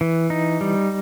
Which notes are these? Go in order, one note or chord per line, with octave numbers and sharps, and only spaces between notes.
E3
D#4
G3